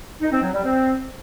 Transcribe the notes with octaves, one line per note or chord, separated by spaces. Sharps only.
D#4
C4
F#3
G3
C4